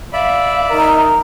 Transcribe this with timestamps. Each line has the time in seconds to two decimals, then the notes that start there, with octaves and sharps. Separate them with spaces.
0.13 D5 E5 F5 B5
0.70 D#4 A#4